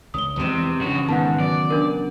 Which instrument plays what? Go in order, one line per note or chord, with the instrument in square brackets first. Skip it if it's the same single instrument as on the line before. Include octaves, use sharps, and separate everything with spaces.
[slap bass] C#2 [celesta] D#6 G7
[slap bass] E2 F3 G#3 [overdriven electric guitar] C3 [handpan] E3
[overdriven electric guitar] G2 F#4 [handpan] C#3 C#4
[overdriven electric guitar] G#2 [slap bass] D#3 [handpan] B3 F#5 [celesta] A5
[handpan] F#3 [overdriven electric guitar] D5
[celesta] D4 A#4